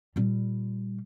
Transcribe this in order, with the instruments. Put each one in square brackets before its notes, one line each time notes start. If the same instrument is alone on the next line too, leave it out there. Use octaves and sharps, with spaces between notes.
[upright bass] A#2 G3